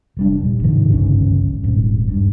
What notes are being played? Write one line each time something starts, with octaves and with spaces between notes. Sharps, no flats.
F1 G3 D4
D#1
G#2 C3 D#3 F3
G1 C#2 C#4
D#1 G#2
G2